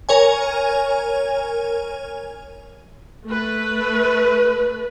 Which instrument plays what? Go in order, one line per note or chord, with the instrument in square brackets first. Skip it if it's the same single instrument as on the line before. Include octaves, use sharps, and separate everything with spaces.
[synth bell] A#4 C#5 G#5
[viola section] A3 B4